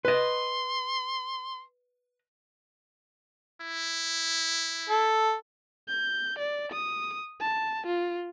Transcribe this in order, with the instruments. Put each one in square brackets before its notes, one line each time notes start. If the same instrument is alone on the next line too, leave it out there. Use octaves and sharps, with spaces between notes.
[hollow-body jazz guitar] B4 D#5 [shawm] C6
[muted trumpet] E4
[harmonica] A4
[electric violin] G6
D5
D#6
A5
F4